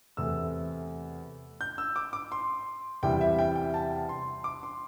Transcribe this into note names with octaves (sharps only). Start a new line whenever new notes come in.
E2 C3 A3 E6
G6
E6
D6
D6
C6
E2 C3 G3 E4 G5
E5
G5
G5
A5
C6
D6
C6